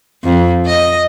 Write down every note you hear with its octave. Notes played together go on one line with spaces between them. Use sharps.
F2
D#5